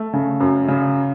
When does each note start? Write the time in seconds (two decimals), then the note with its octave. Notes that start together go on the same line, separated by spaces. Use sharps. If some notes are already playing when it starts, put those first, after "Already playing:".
Already playing: A3
0.13 C#3
0.40 F#2
0.68 C#3